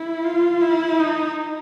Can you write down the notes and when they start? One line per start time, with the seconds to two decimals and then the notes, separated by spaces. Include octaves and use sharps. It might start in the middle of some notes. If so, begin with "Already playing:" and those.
Already playing: E4
0.24 F4
0.62 E4
0.99 D#4